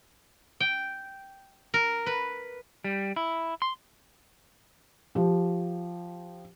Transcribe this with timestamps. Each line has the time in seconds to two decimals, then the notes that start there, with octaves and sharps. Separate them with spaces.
0.60 G5
1.74 A#4
2.06 B4
2.84 G3
3.16 E4
3.62 C6
5.15 F3 G4